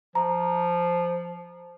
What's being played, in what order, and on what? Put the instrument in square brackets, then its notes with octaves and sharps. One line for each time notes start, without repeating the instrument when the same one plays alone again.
[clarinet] F3 [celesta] A#5